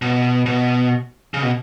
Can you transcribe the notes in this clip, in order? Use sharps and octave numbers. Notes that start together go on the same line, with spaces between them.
B2
B2
C#3
B2